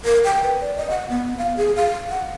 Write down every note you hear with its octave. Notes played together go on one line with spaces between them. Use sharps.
A#4
G5
B4
D5
D#5
F#5
B3
F5
G#4
F5
F#5